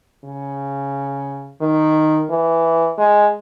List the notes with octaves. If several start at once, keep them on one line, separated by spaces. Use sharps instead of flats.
C#3
D#3
E3
G#3